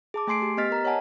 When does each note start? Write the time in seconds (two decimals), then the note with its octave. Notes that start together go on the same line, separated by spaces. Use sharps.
0.14 G#4 A5 D6
0.27 A3 G#5 C6 C7 D7
0.42 G4
0.57 B3 G4 D#5 F6 A6 B6
0.72 A#4 A#5
0.85 C#5 D#5 F#5 G#5 A5